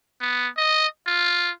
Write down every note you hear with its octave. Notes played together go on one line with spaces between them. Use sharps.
B3
D#5
F4